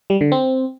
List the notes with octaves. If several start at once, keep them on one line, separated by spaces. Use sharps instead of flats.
G3
D3
C4